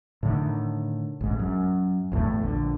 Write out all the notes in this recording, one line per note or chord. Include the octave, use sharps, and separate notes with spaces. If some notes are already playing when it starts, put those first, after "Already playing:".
A2 D3 D#3
A1 G#2
F#2
G1 E2 A2 A3
A#1 D3